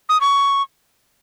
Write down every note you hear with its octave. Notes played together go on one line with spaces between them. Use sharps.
D#6
C#6